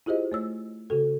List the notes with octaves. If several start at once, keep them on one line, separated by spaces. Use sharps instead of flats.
E4 F4 G4 G#4 C5 D#5
A3 C#5 E6
C#3 F#4 A4